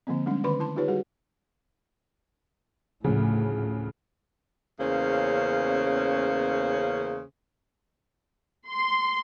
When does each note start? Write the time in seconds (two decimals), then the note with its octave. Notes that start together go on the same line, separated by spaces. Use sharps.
0.07 D3 F3 A#3 C4
0.26 G3 G#3 C#4 D4
0.44 D3 D#3 B4 B5 C6
0.60 E4 A5 C6
0.76 D#4 F4 G4 B4 C#5
0.88 G3 F#4 G#4
3.04 D2 A2 C#3 F3
4.80 E2 C#3 A#3 C#4 C5
8.69 C6